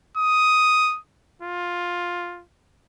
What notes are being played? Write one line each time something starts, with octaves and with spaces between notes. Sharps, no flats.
D#6
F4